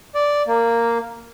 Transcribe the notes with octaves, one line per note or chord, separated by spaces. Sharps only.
D5
A#3